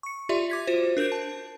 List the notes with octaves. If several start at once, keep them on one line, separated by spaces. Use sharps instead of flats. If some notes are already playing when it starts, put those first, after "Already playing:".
C#6 C#7
F4 G4 D5 E5 C6
D6 G#6 B6
F4 F#4 C5
D4 A#4 C5 G6 D7
A5